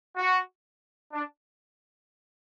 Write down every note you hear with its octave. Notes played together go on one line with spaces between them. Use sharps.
F#4
D4